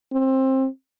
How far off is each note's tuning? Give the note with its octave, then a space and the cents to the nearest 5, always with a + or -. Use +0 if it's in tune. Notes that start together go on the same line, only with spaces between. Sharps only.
C4 +20